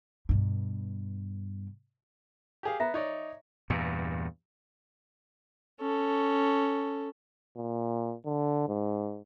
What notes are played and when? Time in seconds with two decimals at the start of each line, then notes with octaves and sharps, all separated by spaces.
0.29 G2 B2
2.63 G4 G#4 F5
2.80 B3 E5 A#5
2.94 D#4 C#5 D5
3.70 E2 G2 A#2
5.81 C#4 A4
7.56 A#2
8.25 D3
8.68 G#2